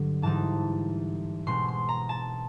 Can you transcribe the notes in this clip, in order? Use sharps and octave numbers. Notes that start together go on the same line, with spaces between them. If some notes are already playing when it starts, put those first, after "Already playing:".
Already playing: G2 D3 F#3
G#2 E3 G3 C4 D#4 A5
B2 G#3 C4 C6
C6
A#5
A5